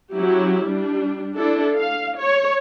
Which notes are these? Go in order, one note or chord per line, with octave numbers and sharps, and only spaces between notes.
F#3 C#4 E4 G4
G3 D4
D4 E4 A4
F5
C#5